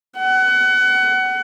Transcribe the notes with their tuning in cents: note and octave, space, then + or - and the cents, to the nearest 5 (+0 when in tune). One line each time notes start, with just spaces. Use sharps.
F#5 +25